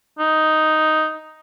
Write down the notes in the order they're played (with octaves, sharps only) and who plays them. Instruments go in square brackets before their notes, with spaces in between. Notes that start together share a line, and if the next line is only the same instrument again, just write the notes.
[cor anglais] D#4